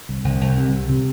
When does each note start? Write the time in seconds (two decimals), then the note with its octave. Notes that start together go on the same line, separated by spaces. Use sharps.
0.09 C2
0.24 C2
0.41 C2
0.57 C3
0.73 C3
0.89 C3